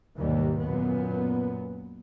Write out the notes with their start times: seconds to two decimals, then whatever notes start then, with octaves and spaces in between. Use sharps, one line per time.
0.16 D#2 G#2 B2 E3 G3
0.62 F#2 A#2 B3